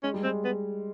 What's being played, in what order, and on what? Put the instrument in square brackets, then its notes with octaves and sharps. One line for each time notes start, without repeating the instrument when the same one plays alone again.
[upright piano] G#3 [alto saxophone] C#4
[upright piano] G3
[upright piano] G#3 [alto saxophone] C4
[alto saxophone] B3